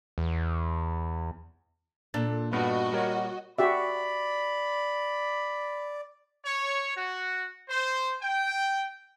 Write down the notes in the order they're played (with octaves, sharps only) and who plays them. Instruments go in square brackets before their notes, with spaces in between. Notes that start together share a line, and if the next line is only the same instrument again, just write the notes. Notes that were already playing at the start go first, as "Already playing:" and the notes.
[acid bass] E2
[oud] A#2 A4 [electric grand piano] D4 A6
[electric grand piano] G2 B3 [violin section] F#4 D#5
[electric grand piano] G3 A#4 C#5
[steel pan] F#4 G4 E5 [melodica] D5 [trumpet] B5
[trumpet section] C#5
F#4
C5
G5